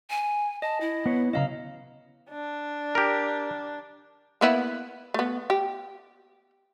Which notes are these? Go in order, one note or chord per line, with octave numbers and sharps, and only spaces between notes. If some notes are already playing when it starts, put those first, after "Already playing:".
G#5
D#5 A5
E4
B3 B4 C#5
C#3 F#3 C#4 D#5 F5 A#5
D4
G4 A#4
A#3 B3 E4
A3 B3
G4